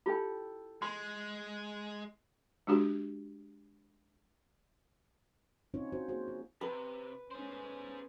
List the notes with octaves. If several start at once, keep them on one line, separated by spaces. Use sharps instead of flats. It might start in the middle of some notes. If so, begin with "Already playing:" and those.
E4 F4 G4 A4 G5
G#3 C6
G#3 D4 F#4 G4
C4 C#4 D#4 F4 C#5
F4 F#4 C5
A#3 F#4 G#4 C5
F4
C3 B4
A3 B3 C#4 G#4 C5